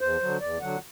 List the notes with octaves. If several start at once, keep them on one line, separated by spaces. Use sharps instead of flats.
E2 C5
D3 F#3
E2 D5
D3 F#3 F#5